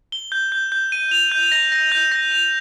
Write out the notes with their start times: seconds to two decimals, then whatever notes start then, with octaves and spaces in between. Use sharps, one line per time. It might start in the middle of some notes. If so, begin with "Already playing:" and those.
0.12 G7
0.32 G6
0.52 G6
0.72 G6
0.92 D#7
1.11 F7
1.32 G6
1.52 A#6
1.72 A#6
1.92 G6
2.12 A#6
2.32 F7